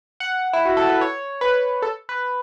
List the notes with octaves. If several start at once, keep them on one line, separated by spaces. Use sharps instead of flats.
F#5
E4
F#4
A4
B4
C#5
B4
A4
B4